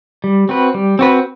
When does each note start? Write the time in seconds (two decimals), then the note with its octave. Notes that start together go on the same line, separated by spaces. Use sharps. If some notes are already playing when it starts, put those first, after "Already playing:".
0.24 G3
0.49 C4 F#4 B4
0.74 G3
0.99 C4 F#4 B4